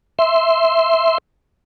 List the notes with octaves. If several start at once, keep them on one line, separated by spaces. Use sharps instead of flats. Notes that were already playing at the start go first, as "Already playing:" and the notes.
E5 C6